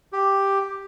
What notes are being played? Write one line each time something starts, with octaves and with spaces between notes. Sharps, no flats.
G4